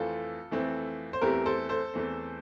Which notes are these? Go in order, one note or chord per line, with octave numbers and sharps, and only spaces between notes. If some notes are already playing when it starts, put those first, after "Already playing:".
Already playing: F2 E3 A3 C4 F4 A4
F2 E3 A3 C4
C5
E2 E3 A3 C4 G4 A#4
A4 C5
A4 C5
E2 E3 A3 C4